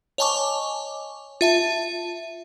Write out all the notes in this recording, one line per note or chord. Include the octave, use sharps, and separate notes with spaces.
C#5 D#5 G#5 A5 C#6 D6
F4 E5 A5